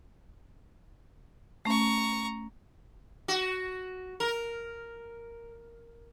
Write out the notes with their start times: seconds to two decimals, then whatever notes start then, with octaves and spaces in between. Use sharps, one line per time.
1.65 A3 C#4 A#5 C#6
3.28 F#4
4.20 A#4